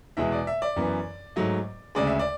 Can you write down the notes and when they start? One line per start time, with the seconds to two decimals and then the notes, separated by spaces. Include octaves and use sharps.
0.17 E2 B2 G#3 E5
0.32 D5
0.47 E5
0.62 D5
0.76 F#2 E3 B3
1.36 G#2 F#3 A3
1.95 D2 C#3 G#3 D5
2.07 E5
2.19 D5